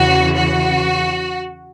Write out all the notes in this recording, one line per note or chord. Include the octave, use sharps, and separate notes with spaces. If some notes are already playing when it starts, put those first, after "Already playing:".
Already playing: E2 C#3 E3 F#4
F#4